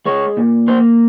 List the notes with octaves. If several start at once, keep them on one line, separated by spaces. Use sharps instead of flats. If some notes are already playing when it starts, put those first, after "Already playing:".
G#3 C#5
A#2
A#3 C5